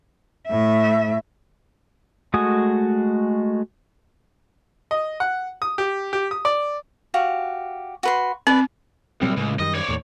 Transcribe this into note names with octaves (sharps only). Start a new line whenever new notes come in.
A2 E5
G#3 A3 F#4 G#5 D#6
D#5
F#5
D#6
G4
G4
D#6
D5
F#4 G4 F5
F#4 B4 C6
C4 B4 D5
C2 A#2 F#3 C4
C#2 A2
F#2 D#3 G3 D#5
C#5 D5
D#2 A2